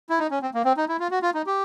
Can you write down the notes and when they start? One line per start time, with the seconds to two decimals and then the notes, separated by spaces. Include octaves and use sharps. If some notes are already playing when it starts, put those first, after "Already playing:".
0.10 E4
0.19 D#4
0.31 C#4
0.42 C4
0.54 A#3
0.65 C4
0.77 D#4
0.89 E4
1.00 F4
1.11 F#4
1.22 F4
1.34 D#4
1.46 G4